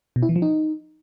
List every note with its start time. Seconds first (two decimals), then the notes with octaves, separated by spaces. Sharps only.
0.16 B2
0.23 E4
0.29 E3
0.36 F3
0.42 D#4